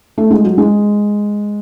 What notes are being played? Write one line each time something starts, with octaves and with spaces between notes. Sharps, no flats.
A3
G#3
F#3
G#3